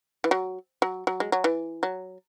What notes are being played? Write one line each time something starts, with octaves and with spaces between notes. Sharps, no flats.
E3
F#3
F#3
F#3
G#3
F#3
E3
F#3